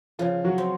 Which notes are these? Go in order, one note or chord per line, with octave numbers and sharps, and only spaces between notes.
C#3 F3 F4
F#3 F#4
C4